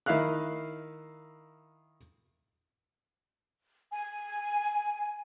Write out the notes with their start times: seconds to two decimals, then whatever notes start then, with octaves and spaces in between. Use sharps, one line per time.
0.06 D#3 E4 D#5 F5 F6 F#6
3.91 G#5